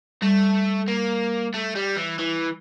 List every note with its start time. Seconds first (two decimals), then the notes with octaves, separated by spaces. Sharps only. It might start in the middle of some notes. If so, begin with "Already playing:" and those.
0.22 G3 A3
0.88 A#3
1.54 A3
1.76 G3
1.97 E3
2.19 E3